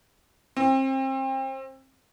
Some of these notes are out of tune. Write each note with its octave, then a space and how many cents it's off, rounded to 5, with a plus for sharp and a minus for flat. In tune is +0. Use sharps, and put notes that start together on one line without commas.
C4 +30